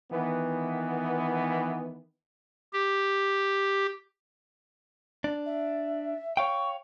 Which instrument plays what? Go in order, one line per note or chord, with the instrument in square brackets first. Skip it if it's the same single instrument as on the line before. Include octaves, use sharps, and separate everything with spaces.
[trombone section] D#3 E3 B3
[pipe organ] G4
[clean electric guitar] D4
[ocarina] E5
[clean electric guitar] C#5 F5 G5 [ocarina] C#6